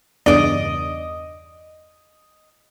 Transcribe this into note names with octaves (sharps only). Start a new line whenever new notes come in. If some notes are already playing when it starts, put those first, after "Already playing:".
E2 G2 C#3 D5 D#5 D6